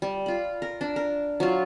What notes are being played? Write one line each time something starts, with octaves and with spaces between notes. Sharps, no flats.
G3
F4 B5
A#4
D4
A#4
F#3 F4